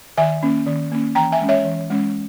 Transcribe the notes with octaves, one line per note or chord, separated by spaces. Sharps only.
D#3 E5 G#5
A#3 C#4
D#3
A#3 C#4
E3 G5 A#5
E5 G#5
G#3 C#4
C#5 E5
E3
G#3 C#4